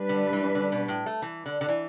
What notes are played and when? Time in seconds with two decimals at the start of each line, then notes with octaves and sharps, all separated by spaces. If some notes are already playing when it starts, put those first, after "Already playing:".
Already playing: G3 D4 B4
0.09 D3
0.33 E3
0.55 D3
0.72 B2
0.88 A2
1.06 A3
1.22 E3
1.46 D3
1.61 D3
1.69 E3